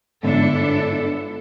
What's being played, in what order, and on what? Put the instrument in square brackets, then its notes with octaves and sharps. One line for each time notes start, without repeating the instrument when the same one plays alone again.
[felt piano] G1 G#2 [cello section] D4 E4 A4